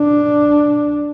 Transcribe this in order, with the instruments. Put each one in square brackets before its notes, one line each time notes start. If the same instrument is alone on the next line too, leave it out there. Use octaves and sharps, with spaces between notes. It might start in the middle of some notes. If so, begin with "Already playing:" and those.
Already playing: [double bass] D4